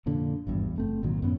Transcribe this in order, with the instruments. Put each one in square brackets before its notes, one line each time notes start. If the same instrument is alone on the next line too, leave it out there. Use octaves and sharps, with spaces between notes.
[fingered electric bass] F2 A#2 D3
G#1 E2 G2
F#1 A3 C4
G#1 A#2 D#3 F#3
F#2 A2 B3 C#4